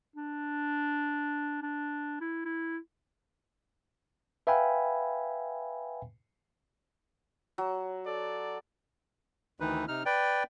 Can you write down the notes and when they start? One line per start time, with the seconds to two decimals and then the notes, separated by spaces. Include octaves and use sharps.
0.16 D4
1.62 D4
2.21 E4
2.45 E4
4.47 B4 E5 F5 G5 G#5 B5
7.58 F#3
8.05 A4 D5
9.60 D2 D#3 E3 D#4 B4
9.88 C3 D#4 F6
10.06 B4 D5 G5